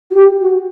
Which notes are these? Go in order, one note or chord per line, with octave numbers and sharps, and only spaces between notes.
F#4
G4
F#4